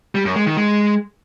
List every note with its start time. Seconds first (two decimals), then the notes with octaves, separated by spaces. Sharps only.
0.15 G3
0.25 F#2
0.36 G#3
0.46 D#3
0.57 G#3